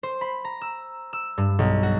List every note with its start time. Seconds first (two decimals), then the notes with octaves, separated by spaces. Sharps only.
0.03 C5
0.21 B5
0.45 A#5
0.61 E6
1.13 E6
1.38 G2
1.59 B1
1.83 F#4